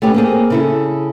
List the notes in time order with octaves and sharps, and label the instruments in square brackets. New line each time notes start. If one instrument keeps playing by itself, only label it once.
[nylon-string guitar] A3 C#4 G4 B4
A#3 C4 G#4
C#3 E4 A4